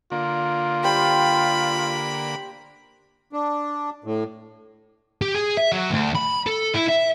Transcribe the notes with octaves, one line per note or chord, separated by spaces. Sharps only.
D3 A#3 F4
G3 C5 B5
D4
A2
G4
G#4
E5
F#3
D2
B5
A4
E4
E5